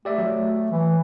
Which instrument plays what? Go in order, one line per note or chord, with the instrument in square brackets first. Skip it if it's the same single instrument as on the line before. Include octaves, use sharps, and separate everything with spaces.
[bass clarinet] A3 [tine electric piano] G4 D5 E5
[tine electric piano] F#3
[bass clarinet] E3